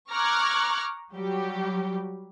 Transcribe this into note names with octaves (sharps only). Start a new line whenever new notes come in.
A#5 C#6 D6 F6 F#6 G#6
F#3 G3 G4